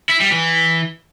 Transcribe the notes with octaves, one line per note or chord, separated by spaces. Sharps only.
E4
G3
E3